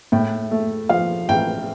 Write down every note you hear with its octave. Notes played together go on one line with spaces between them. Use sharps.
A2 G5
A3
F3 F5
A1 G5